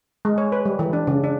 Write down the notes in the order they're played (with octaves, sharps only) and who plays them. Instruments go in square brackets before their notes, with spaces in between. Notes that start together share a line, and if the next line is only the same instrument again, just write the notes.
[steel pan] G#3
C#5
B4
G3
E3
D4
C#3
D4